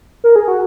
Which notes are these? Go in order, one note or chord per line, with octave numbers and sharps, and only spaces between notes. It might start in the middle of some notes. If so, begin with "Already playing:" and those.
A#4
G#4
F#4